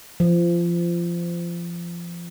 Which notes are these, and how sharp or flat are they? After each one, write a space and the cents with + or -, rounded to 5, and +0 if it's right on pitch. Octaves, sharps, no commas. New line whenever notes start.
F3 -25